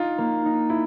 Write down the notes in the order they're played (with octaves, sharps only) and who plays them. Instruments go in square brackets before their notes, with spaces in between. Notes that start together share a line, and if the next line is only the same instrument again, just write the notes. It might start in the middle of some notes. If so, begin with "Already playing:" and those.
Already playing: [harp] D#4 [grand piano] F4
[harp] A#3
D#4
[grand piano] E4